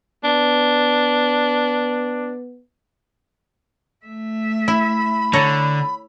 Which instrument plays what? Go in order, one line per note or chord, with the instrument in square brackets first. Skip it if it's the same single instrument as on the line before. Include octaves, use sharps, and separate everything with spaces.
[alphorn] B3 [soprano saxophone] D4
[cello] A3 E5
[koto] E4 [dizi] B5
[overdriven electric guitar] D3 [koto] A4 C#5 A#5